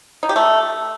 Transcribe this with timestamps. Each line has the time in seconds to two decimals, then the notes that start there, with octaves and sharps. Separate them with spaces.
0.23 D#4
0.29 G4
0.36 A3